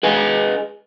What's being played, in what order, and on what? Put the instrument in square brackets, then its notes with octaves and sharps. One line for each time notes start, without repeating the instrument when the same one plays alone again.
[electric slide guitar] G#4 B4 D#5 G#5